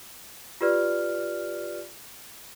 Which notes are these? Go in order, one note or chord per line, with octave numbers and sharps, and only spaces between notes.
F4 G4 B4 D5 F6